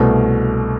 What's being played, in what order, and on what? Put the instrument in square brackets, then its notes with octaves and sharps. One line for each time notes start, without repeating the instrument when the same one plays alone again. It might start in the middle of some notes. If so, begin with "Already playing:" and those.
Already playing: [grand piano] C2 B2 A3